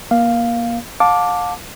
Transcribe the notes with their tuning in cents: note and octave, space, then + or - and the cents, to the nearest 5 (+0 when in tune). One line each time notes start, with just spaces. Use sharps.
A#3 +25 F5 +0
F5 +35 A5 +0 D6 +0